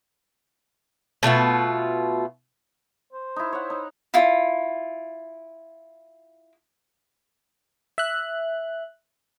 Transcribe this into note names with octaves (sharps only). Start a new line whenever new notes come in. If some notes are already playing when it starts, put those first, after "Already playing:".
B2 A3 F4 F#5
C5
D#4 E4
C#5 F#5
D#4
E4 F4
E5 F#6